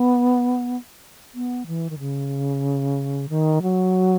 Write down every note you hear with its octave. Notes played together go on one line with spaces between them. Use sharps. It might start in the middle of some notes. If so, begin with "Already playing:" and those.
Already playing: B3
B3
E3
D#3
C#3
D#3
F#3